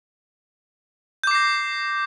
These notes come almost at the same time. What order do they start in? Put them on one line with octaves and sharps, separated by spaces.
G6 D6 C7 A#6